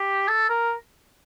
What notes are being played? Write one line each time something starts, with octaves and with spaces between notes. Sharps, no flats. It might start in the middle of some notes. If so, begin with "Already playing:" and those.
Already playing: G4
A4
A#4